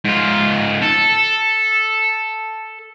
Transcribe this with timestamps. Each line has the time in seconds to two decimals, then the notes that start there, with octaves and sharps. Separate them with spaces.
0.05 G#2 F4
0.82 A4